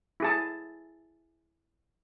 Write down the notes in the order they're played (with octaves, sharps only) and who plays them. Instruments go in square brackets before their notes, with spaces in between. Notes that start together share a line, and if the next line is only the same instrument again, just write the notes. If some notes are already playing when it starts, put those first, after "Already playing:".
[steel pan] E4 G#4 A5